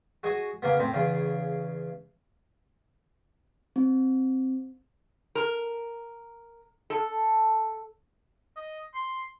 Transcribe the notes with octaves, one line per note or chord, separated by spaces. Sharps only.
F#4 G#4 D#5 C#6
C#3 A#3 B3
A2 C4
E2 C#3
C4
A#4
A4
D#5
C6